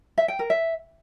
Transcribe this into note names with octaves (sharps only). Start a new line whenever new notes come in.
E5
G5
A#4
E5